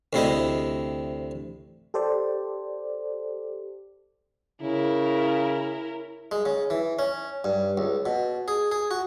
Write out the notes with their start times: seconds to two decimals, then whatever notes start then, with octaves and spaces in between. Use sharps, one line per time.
0.13 D2 C3 E4 D#5
1.94 G4 A4 C5 D5
4.62 C#3 E4 A#4
6.31 G#3
6.46 C#3
6.70 E3
6.99 C#4
7.44 G2
7.78 C#2
8.06 B2
8.48 G#4
8.72 G#4
8.91 F#4